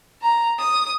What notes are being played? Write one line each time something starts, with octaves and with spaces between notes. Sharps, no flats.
A#5
D#6